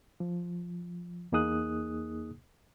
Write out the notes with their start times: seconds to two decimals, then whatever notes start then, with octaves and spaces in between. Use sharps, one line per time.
0.20 F3
1.32 E2 A#3 D#4 G#4 D#6 F#6